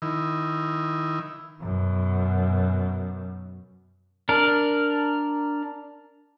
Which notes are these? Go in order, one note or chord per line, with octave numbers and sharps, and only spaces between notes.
D#3 E4
F#2 B2
D4 A#4